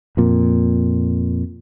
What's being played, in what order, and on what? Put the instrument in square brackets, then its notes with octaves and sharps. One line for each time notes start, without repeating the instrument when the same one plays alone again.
[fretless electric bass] F2 A#2